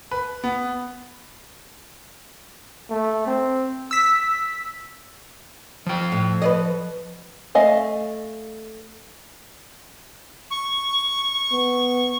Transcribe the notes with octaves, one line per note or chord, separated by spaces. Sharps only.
B4
B3
A3
C4
E6 B6
F3 G5
A2
B4 D5 D#5
A3 D#5 F5 G#5
C#6
B3